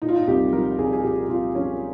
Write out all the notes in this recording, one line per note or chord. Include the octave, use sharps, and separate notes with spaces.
A#2 D#4
F4
D#4
C2 G4
F3 A#4
C2 G#4
G#4
A#2 G4
C2 F4
F3 C#4